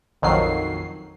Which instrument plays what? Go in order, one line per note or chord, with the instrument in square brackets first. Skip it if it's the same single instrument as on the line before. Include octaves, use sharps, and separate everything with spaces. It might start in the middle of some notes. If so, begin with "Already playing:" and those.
[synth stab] A#1 F2 D#3 F#3 C7